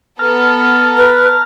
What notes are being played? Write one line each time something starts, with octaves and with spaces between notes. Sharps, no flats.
B3 A4 A5 A#5 F6
B4